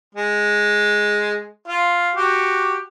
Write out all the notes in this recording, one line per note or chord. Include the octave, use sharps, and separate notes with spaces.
G#3
F4
F#4 G4